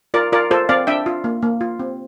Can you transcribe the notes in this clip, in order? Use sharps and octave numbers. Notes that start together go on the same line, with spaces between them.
F4 A#4 D5
F4 A#4 D5
F4 A4 C5
C4 D5 F5
D4 E5 G5
F4
A#3
A#3
F4
C4